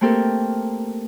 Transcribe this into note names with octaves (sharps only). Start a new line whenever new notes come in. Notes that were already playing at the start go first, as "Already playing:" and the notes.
A3 A#3 C4 G4 A4 A#4